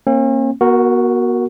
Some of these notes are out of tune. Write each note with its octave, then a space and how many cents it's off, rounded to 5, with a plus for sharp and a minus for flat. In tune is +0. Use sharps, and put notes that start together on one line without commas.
A#3 +0 C#4 -45
B3 -40 F#4 +0 A#4 +0